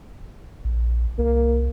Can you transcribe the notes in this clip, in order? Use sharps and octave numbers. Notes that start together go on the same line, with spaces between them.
A#1
C2 A#3